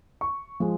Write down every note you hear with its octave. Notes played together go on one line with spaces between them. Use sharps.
C#6
F3 G#3